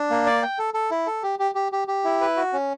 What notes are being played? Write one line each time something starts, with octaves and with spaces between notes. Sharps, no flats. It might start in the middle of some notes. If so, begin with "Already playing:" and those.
Already playing: D4
A#3
D5
G5
A4
A4
E4
A4
G4
G4
G4
G4
G4
E4
B4
F#4
C#4